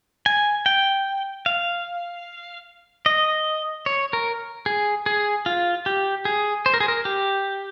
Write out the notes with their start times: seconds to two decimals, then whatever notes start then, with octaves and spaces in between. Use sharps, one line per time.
0.26 G#5
0.66 G5
1.46 F5
3.06 D#5
3.86 C#5
4.13 A#4
4.66 G#4
5.06 G#4
5.46 F4
5.86 G4
6.25 G#4
6.66 C5
6.74 A#4
6.80 G#4
6.88 A#4
7.05 G4